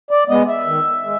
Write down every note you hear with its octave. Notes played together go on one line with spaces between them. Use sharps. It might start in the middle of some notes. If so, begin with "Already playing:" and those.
D5
G#3 B3 D#5
E5
D#3
G#3